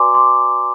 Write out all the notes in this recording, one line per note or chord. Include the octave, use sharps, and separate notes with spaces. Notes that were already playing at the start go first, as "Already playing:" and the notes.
Already playing: F#4 B4 D5 G#5 A#5 C6 D6
C6 D6